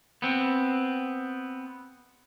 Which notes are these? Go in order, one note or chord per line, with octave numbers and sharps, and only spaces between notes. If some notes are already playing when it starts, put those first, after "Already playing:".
B3 C4